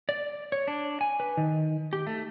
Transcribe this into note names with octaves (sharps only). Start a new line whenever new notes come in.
D5
C#5
D4
G#5
B4
D#3
G4
A3